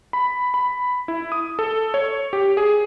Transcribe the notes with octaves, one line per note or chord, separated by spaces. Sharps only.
B5
B5
E4
D#6
A4
C#5
G4
G#4